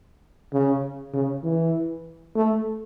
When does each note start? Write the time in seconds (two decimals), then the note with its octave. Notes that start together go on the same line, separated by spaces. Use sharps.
0.53 C#3
1.14 C#3
1.44 E3
2.36 A3